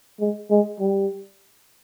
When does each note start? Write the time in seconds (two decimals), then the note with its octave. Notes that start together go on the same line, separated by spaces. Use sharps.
0.20 G#3
0.50 G#3
0.80 G3